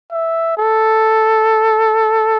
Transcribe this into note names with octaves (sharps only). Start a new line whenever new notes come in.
E5
A4